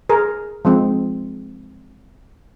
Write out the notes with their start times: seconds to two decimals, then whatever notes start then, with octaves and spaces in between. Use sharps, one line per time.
0.09 G#4 A#4
0.65 F3 G#3 C4